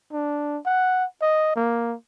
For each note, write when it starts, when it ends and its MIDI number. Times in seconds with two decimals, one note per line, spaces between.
0.13 0.58 62
0.66 1.05 78
1.22 1.55 75
1.56 1.95 58